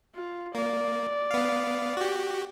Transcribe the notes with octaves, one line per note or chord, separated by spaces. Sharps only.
F4
A#3 D5
B3 F5
F#4 G4